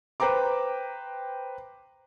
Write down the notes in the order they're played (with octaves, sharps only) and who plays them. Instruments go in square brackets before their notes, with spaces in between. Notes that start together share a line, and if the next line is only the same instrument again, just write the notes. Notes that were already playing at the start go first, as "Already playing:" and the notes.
[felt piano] B4 C5 G5 A#5 D6